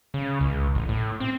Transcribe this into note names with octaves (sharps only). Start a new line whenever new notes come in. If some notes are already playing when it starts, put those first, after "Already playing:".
C#3
C#2
A1
A2
C4